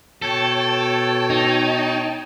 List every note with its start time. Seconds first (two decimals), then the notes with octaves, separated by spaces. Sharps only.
0.22 B2 A4 C#5 G5 A5
1.30 D#4